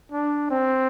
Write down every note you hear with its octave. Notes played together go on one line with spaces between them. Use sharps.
D4
C4